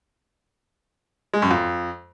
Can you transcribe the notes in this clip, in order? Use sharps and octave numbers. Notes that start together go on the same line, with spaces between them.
G#3
F#2
F2